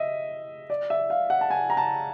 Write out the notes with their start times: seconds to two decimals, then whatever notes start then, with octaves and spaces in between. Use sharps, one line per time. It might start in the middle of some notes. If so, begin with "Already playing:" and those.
Already playing: D#5 E5
0.70 D5
0.90 E5
1.10 F5
1.30 F#5
1.41 A5
1.50 G#5
1.70 A#5
1.77 A5